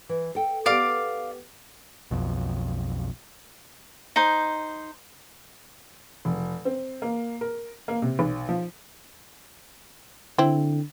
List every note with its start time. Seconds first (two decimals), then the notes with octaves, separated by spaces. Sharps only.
0.09 E3
0.35 A4 G5
0.66 B3 G4 A4 D5 F5 D6
2.11 B1 F2
4.16 D#4 C5
6.25 F1
6.65 C4
7.02 A#3
7.41 A#4
7.88 A#3
8.02 C3
8.19 B1
8.49 F3
10.38 D3 C4 E4